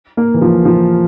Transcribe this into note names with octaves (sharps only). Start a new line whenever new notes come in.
A#3
E3
F3
F3